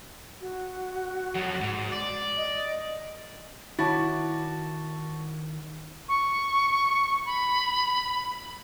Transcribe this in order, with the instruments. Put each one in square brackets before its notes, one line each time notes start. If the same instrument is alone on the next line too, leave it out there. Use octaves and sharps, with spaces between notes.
[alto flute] F#4
[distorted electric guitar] F2 F#3
G#2
D5
[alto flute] D#5
[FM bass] D#3 [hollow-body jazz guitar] E4 C#5 [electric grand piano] F#4 D6 [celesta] A5 A6
[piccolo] C#6
B5